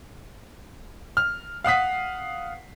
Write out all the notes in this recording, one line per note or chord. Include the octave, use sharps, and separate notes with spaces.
F6
F5 F#5 D#6 B6